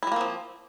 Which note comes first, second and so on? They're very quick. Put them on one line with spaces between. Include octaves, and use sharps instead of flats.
E4 G3 A#3 C4 F3